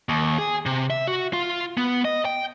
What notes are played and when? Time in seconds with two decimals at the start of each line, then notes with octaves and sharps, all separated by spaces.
0.09 D#2
0.38 G#4
0.66 C3
0.90 E5
1.08 F#4
1.33 F4
1.77 B3
2.05 D#5
2.25 G5